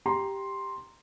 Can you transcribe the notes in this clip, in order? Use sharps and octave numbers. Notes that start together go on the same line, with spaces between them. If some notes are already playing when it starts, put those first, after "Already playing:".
G4 A#5 C6